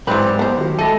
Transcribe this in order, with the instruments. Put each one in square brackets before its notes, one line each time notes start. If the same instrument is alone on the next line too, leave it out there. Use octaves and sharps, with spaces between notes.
[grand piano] G#2 D5 [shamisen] E3 B4 [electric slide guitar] F#3 [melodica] C4 G4 C5
[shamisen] B3 C5 [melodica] G4
[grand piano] D#3 F#4
[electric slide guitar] G#3 A3 [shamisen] A4 [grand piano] B5 A#6 D#7